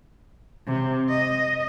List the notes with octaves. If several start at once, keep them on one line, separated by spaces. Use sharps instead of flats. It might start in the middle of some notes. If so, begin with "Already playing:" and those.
C3
D#5